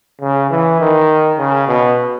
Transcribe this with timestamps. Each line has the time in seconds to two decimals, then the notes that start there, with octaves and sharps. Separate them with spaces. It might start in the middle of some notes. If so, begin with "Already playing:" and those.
0.21 C#3
0.50 E3
0.80 D#3
1.38 C#3
1.68 B2